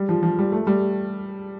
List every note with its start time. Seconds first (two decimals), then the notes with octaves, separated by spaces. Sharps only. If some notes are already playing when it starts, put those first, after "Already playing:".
Already playing: G3
0.09 F3
0.23 F3
0.39 G3
0.52 A3
0.67 G3